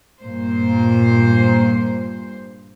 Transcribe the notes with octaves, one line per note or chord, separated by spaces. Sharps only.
G2 A#2 C5